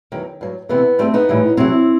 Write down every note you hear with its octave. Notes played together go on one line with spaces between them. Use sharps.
E2 D#3 F#3
G2 F#3
E2 C3 E3 B3
G2 E3 G3 A3 C4
B3 D#4
A2 E3 G3
E2 C3 F#3 C4 E4